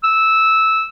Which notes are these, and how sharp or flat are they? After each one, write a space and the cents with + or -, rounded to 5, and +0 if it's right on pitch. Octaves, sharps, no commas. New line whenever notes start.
E6 -10